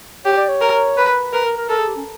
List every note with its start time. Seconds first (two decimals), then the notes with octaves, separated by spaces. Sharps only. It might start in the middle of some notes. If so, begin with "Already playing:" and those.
0.25 G4 C#5
0.37 D5
0.49 C#5
0.61 A#4
0.97 B4
1.33 A#4 B4
1.45 A#4
1.57 A#4
1.69 A4 A#4
1.78 G#4
1.88 G4
1.96 C#4